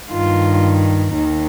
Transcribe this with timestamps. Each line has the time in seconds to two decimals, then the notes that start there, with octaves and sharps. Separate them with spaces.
0.10 G2 D#3 F4
1.14 D#2 D#3